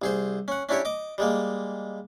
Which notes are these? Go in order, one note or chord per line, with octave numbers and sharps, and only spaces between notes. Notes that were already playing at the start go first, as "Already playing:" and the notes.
C2 G#4 C5
C#4 F#5
C#4 D4 E4 G4 C#5
D#5 D6
G3 G#3 A#3